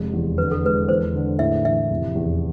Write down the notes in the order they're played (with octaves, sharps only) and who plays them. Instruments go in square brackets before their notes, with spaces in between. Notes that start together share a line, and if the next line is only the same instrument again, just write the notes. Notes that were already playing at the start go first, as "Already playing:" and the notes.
Already playing: [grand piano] F1 G#3
E2
[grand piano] D3 [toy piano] B4
[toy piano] A4
[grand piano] G#3 [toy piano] B4
[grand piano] E2 [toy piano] C5
[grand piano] D3
[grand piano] A2 [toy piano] E5
[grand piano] E3 [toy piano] E5
[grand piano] F1
E2